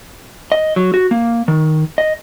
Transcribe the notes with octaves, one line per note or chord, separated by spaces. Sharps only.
D#5
F#3
F#4
A#3
D#3
D#5